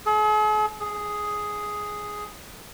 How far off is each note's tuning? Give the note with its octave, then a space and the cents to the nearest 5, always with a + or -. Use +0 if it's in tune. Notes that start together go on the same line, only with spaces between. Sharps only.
G#4 +45
G#4 +0